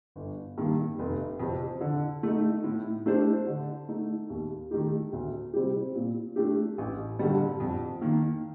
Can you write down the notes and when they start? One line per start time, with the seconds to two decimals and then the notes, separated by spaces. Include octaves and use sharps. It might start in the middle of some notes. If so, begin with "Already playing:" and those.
0.16 G1
0.58 G2 D#3 A#3
0.99 F1
1.39 F2 C3
1.81 D3
2.23 A3 D#4
2.64 A2
3.06 A3 D4 G4 C5
3.47 D3
3.88 A3 D#4
4.30 D#2
4.71 D#3 A3 D#4 G4
5.13 D2
5.53 C3 G3 C4 G4
5.95 A#2
6.36 A3 D4 G4
6.78 A1
7.19 G2 D3 G3
7.60 F2
8.01 D#3 A#3